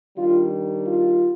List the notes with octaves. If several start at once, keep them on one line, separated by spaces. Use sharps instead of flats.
D#3 G3 D4 F4
F4